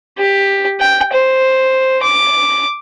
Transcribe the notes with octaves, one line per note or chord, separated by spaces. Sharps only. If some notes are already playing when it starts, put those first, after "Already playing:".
G4
G5
C5
D6